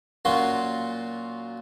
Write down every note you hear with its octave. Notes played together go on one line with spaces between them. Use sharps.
A#2 F#3 C#4 F4 F#4 C6